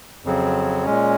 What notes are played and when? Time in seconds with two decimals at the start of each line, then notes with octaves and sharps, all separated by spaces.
0.25 F2 C#3 F#3 C4
0.86 A#2 G#3 C#4